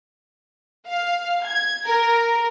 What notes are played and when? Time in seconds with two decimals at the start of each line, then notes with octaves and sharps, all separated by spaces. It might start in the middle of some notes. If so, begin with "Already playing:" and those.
0.88 F5
1.46 G#6
1.85 A#4